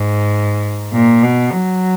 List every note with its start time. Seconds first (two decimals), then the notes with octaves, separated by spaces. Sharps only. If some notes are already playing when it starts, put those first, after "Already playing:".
Already playing: G#2
0.93 A#2
1.23 B2
1.52 F#3